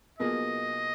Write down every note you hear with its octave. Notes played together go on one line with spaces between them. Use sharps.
B1 B2 A#3 F4 G#4 D#5